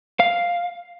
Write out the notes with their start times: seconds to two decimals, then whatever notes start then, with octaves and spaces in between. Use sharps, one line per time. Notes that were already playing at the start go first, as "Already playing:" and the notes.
0.20 F5